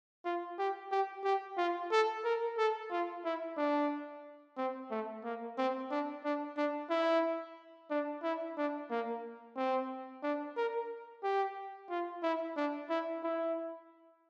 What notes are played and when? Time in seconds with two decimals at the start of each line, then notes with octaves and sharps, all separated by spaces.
0.25 F4
0.58 G4
0.91 G4
1.24 G4
1.57 F4
1.91 A4
2.24 A#4
2.57 A4
2.91 F4
3.24 E4
3.57 D4
4.57 C4
4.91 A3
5.24 A#3
5.57 C4
5.90 D4
6.24 D4
6.57 D4
6.90 E4
7.90 D4
8.23 E4
8.57 D4
8.90 A#3
9.56 C4
10.23 D4
10.57 A#4
11.23 G4
11.90 F4
12.23 E4
12.56 D4
12.89 E4
13.23 E4